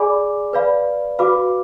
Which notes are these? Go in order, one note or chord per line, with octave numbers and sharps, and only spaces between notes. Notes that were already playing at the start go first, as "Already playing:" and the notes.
Already playing: G#4 D5 G#5 B5 D6
B4 D5 F5 B5
F#4 B4 F5 B5 D6